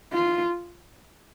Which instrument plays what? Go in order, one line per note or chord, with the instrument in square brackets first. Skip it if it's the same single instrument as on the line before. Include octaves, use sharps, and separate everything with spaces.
[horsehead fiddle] F4